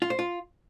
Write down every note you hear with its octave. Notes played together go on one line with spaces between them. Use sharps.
F4
C5
F4